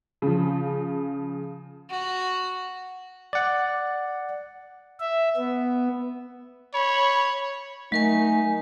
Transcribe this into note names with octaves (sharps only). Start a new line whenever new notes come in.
C#3 F3
F#4
D5 F#5
E5
B3
C#5 B5
F#3 A3 D#4 A#4 G#5